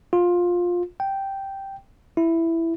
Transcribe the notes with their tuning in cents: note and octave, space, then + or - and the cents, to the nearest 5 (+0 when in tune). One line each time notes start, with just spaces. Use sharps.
F4 +15
G5 -5
E4 +5